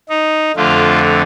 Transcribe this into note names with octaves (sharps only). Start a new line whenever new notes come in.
D#4
F2 D3 A3 F4